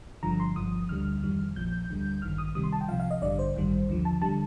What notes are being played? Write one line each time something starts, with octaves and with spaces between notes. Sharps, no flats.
G1 G2 D3 F3 A#5
C6
G1 G2 F3 D#6
D2 D3 G3 F6
F2 D#3 G3
A#1 A#2 F3 G6
D2 D3 G3
A1 G2 D#3 F6
D#6
C2 C3 D#3 G3 D#6
C6
A5
G5
C2 C3 F3 F5
F5
D#5
A1 G2 D3 G3 D5
C5
A1 G2 D#3 G3
D#2 D3 F3
A5
D3 G3 A5